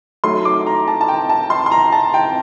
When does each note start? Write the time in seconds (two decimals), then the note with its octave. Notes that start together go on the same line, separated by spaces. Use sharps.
0.24 F#3 A3 D#4 C6
0.45 D6
0.67 A#5
0.88 A5
1.01 A5
1.08 G5
1.29 A5
1.50 C6
1.66 C6
1.71 A#5
1.92 A5
2.14 G5